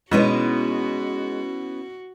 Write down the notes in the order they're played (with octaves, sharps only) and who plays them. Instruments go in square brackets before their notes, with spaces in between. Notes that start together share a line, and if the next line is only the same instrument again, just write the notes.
[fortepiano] B2 [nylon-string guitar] G#3 D#4 B4 [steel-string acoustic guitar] B3 C#4 E4 [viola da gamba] F#4